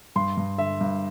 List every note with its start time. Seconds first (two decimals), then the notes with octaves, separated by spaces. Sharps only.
0.16 G2 C6
0.37 G2
0.58 D3 E5
0.81 G2